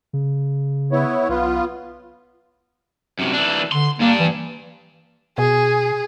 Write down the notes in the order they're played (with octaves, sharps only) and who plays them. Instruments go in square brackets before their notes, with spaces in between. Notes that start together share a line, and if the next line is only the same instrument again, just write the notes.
[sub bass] C#3
[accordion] B3 E4 C#5
[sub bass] B1 [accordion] B3 F4
[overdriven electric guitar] F#2 C3
E3 D4
[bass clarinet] D3 [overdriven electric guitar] C6
[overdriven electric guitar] G2 D4 [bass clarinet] A#3
[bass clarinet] E3
[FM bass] B2 [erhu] G#4